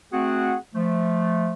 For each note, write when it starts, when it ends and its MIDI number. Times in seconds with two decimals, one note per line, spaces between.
0.12 0.55 57
0.12 0.55 60
0.12 0.55 66
0.12 0.55 68
0.12 0.55 78
0.75 1.53 53
0.75 1.53 57